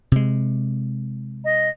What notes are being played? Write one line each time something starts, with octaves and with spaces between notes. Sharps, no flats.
C3 G#3
D#5